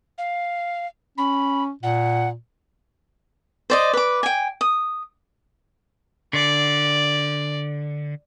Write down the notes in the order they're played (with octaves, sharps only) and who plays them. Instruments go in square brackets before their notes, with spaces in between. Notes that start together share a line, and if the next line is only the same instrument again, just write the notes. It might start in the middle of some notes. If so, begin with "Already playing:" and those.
[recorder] F5
[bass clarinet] C#4 [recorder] B5
[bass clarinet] A#2 [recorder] F#5
[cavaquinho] C5 D5 D#5
B4 D6
G5 G#5
D#6
[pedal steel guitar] D3 [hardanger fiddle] D5